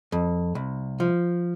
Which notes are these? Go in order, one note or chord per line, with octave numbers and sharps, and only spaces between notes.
F2
C2
F3